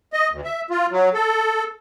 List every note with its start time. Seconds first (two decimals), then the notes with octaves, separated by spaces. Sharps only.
0.13 D#5
0.31 D2
0.44 E5
0.70 F4
0.91 F#3
1.14 A4